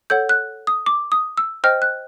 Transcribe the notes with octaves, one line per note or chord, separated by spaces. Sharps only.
A4 C#5 F#5 G6
F#6
D#6
D6
D#6
E6
C5 D#5 G5 F6
F#6